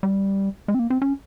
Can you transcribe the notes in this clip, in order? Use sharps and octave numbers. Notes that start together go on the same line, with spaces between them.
G3
G#3
C4
A#3
C4
C#4